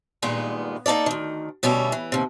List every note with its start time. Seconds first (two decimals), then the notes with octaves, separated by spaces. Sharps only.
0.22 G2 A#2 D#3 G#3 B3
0.86 A#3 D#4 F4 A4 D5
1.06 D2 D#3
1.63 D2 B2 G3 C#4 E5
1.92 E3
2.12 D#2 C3